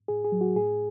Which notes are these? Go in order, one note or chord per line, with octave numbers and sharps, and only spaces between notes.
A2 G#4
G#4
F#3
F#4
A2 G#4